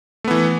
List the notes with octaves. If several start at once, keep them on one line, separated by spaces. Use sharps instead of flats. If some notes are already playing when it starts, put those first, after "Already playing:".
E3 A3 B3